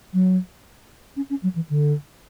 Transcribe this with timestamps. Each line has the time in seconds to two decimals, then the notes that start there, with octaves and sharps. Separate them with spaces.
0.13 F#3
1.16 C#4
1.30 C#4
1.43 F#3
1.55 E3
1.69 D3